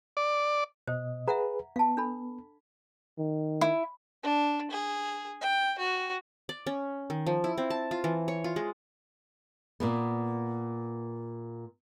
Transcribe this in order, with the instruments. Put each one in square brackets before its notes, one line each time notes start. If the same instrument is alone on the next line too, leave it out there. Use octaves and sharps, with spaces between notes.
[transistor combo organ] D5
[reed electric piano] B2 D#5 [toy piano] C5
[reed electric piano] G#4 B4 [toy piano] E5 F#5 A#5
[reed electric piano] B3 [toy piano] F5 A5
[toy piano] D4 A4 B5
[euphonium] D#3
[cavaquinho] E4
[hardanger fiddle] D4
G#4
G5
F#4
[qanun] D5
C#4
D#3
F3
E4
C4
A5
F4
E3
C#5
F4
G#3
[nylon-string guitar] A#2 A#3 B3